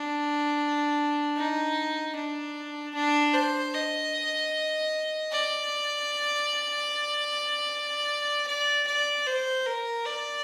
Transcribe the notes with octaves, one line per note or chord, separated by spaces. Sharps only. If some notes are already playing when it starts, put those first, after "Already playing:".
Already playing: D4
D#4
D4
D4
C5
D#5
D5
D5
D5
C5
A#4
D5